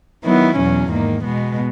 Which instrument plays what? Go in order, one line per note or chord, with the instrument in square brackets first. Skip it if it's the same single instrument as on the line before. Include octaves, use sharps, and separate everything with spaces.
[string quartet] D#3 F#3 B3 E4
E2 B2 F#3 C#4
G#2 D#3 A#3
B2 G#3 B3